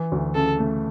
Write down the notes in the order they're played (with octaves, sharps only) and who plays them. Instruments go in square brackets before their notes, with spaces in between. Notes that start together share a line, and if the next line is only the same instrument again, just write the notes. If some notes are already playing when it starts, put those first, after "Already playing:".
Already playing: [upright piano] E3
D2
[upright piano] C#3 [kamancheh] A4
[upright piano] A3